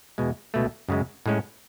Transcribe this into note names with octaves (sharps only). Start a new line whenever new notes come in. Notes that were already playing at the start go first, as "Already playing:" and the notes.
E2 B2 G#3
C#2 B2 A3
F#2 C#3 G#3
A2 G#3 C#4